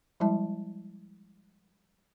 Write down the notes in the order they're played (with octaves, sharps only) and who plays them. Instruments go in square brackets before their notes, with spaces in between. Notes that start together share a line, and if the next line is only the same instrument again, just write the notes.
[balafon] F3 G3 G#3 E4 E5 A5